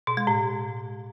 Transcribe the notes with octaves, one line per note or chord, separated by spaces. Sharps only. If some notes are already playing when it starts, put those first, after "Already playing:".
B2
G#3
A2